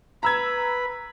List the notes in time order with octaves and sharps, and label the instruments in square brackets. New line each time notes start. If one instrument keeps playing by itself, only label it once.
[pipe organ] B4 B5 [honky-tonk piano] A#5 E6 G#6